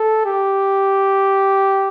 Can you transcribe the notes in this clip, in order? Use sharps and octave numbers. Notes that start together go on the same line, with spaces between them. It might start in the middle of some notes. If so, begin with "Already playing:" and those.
Already playing: A4
G4